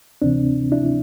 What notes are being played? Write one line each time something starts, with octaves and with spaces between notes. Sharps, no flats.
D2 C3 E3 C4 D4
D4 E4